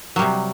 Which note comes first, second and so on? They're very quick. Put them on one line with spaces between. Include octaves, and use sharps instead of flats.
F#3 G3 C3